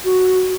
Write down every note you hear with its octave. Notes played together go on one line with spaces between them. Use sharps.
F#4